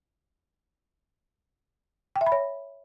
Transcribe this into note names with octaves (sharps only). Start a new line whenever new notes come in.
G5
E5
B5
C#5